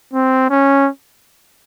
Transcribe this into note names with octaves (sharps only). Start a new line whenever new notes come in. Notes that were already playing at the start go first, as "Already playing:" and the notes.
C4
C#4